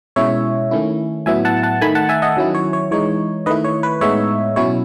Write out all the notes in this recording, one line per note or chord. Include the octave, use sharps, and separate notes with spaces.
B2 G#3 C#4 E4 C#5 E5
D#3 A3 C#4 E4
A2 F#3 B3 E4 E5 G#5
F#5 A5
F#5 A5
D#3 A3 D#4 G#5 B5
F#5 A5
E5 G#5
D#5 F#5
D#3 F#3 C#4 E4
C#5
C#5
E3 G#3 D#4 C#5
D#3 A3 E4 B4 D#5
C#5
B4
A2 G#3 B3 D#4 C#5 E5
B2 F#3 C#4 E4 C#5